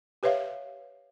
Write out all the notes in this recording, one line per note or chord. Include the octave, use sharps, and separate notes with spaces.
G4 B4 C#5 E5 F5